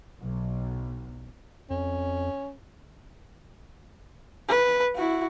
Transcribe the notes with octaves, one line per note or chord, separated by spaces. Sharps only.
B1
F2 C#4
B4
E4 F#4